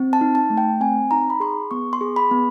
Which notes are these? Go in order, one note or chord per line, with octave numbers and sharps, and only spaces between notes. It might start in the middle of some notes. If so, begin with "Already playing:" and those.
Already playing: C4
A5
D#4
A5
A3
G5
C4 G#5
D#4 A#5
B5
G#4 C6
B3 C#6
C6
G#4
B5
B3